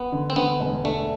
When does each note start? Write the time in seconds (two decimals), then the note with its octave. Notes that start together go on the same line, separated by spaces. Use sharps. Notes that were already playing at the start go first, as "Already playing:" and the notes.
Already playing: B3
0.12 D3
0.30 C4
0.36 D3 B3
0.60 E1
0.84 A3 D4